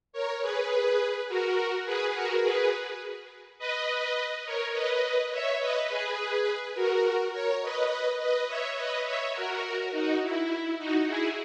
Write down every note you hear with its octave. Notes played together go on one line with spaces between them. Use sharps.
A#4 C#5
G#4 B4
F#4 A#4
G#4 B4
F#4 A#4
G#4 B4
B4 D#5
A#4 C#5
B4 D#5
C#5 E5
B4 D#5
G#4 B4
F#4 A#4
A#4 C#5
B4 D#5
B4 D#5
C#5 E5
B4 D#5
C#5 E5
F#4 A#4
D#4 F#4
E4
D#4 F#4
E4 G#4